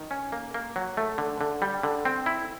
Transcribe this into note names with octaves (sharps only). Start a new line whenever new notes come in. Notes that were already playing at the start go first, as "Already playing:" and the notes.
Already playing: D#3
C#4
A#3
A#3
F#3
A3
D3
D3
G3
D3
C4
E4